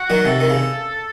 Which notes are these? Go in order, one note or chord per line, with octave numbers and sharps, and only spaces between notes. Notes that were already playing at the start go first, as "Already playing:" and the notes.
Already playing: F#4
D#3 F#3
C3 A4
D#3
C#3